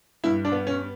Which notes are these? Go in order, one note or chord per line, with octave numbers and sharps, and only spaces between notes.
G2 E4
D4
B3
C#4